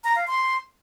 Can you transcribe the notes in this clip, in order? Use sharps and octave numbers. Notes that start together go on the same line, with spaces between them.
A#5
F5
C6